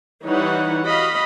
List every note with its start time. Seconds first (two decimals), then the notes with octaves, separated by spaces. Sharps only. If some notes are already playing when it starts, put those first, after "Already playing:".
0.24 E3 G3 D#4 B4 C#5 F#5
0.85 F#4 D#5 F5 B5